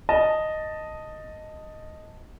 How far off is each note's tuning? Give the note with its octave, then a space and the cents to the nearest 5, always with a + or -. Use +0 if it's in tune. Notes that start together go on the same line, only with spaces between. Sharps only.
D#5 +0 A5 +10